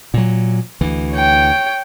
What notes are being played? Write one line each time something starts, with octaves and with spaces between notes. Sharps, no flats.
A#2 F#3
D2 E3
C#5 G5